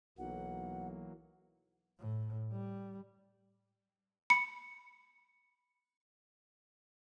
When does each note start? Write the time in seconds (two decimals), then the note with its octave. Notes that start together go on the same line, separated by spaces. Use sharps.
0.18 B1 E3 F#3 A#3 F#5
1.99 A2
2.51 G3
4.30 B5 C#7